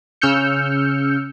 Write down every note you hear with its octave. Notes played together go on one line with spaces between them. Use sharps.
C#3 C#4 E6 F6 G6 C#7